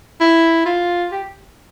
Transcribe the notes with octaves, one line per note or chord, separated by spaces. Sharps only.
E4
F4
G4